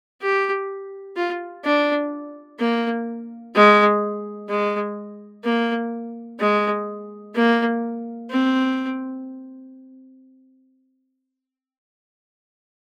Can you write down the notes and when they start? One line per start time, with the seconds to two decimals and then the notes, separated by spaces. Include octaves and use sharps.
0.21 G4
1.17 F4
1.64 D4
2.59 A#3
3.55 G#3
4.49 G#3
5.44 A#3
6.40 G#3
7.35 A#3
8.30 C4